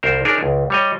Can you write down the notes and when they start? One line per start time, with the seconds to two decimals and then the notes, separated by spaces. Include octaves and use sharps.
0.03 C2 A#4 C5
0.25 D4 D#4 G#4 A#4 C#5
0.43 C#2
0.70 G3 C#5 D#5